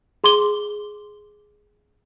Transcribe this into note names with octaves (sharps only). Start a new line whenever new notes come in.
G#4 C6 D6 G7